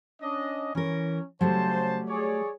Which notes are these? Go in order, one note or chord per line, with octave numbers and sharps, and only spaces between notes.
C#4 D4 D#5
E3 C#4 A#4
C#3 F#3 G3 A3 C5 A5
G#4 C#5 D5